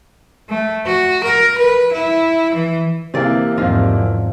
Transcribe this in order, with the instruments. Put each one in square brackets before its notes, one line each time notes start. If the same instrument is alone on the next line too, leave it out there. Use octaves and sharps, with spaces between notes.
[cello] A3
F#4
A#4
B4
E4
E3
[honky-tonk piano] C3 E3 A#3 [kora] C4 D5
[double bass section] E2 G#2 F#3 [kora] D#3 F3 F4